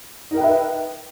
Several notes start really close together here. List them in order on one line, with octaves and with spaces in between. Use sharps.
D#4 A#4 G5 B4 E5